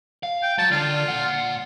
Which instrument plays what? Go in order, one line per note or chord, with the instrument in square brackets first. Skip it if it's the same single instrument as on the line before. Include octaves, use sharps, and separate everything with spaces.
[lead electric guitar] F5
[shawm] G5
[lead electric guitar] F#3 [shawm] A5
[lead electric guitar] D3 [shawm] F4
[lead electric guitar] A#2 F#5